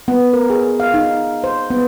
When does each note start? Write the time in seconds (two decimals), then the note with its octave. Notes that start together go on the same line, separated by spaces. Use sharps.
0.08 B3
0.33 A#4
0.50 G#4
0.80 F5
0.94 D#4
1.44 C5
1.70 B3